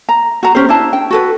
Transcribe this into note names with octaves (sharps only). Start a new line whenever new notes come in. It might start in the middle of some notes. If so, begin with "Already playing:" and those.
A#5
F#4 A#5
C#4 G4 C5
D4 E4 A5
G5
F#4 A4 B4